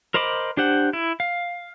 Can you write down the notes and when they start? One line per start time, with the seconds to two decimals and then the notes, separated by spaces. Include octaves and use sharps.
0.14 A#4 C5 D#5 B5 D6
0.57 D4 G4 C5 F#5
0.93 E4
1.20 F5